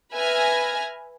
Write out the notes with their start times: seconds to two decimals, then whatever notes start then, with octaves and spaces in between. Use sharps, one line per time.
0.14 B4 E5 G#5 F6 G#6 A#6